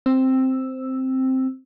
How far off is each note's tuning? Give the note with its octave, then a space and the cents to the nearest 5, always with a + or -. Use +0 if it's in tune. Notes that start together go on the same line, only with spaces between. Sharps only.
C4 +0 E6 +0